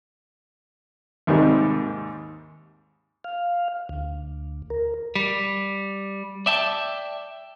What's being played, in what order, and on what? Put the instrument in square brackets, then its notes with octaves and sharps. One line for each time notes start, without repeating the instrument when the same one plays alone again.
[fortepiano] D#2 G#2 C3 D#3 G3
[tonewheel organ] F5
D2
A#4
[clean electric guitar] G3
D5 E5 G5 A5